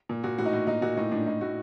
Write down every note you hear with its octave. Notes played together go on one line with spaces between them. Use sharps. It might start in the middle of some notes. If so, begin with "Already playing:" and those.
A#2
A#2 F#4
A2 F#4
D#4
A2 F#4
A#2 D#4
A#2 F#4
A2 D#4
A2 D4
A2 D#4
A2 F#4